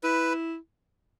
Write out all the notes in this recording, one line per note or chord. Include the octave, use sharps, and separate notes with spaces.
E4 B4